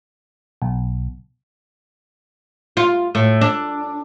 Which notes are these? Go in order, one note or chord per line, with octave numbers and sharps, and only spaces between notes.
B1
F4
A2
D4